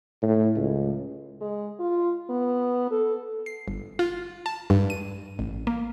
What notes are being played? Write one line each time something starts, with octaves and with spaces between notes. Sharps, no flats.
A2
C#2
G#3
F4
B3
A4
C7
G1
F4
A5
G2
D#7
A1
A#3